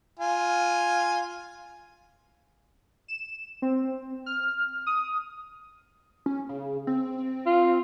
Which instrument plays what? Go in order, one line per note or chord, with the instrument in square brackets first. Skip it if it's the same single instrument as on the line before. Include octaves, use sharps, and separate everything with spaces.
[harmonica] F4 G#5
[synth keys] E7
C4
F6
D#6
[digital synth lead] C#4
C#3
C4
[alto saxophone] F4